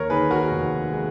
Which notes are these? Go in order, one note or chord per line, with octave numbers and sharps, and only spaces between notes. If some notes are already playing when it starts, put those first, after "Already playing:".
Already playing: D#2 A#4 C#5
D#3 G#4 B4
F#4 A#4
F1
G#3